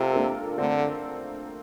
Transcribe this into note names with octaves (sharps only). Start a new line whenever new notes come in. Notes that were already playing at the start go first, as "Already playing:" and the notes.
Already playing: C3 F4 A4 A#4
A#3 D4
D3 A3 C4